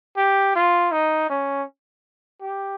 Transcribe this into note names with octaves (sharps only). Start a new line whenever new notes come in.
G4
F4
D#4
C#4
G4